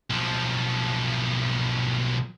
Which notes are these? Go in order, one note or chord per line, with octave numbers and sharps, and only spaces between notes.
B1 F3